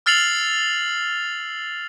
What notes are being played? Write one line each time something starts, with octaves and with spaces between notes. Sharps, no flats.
E6 F6 A6 C7 F7 F#7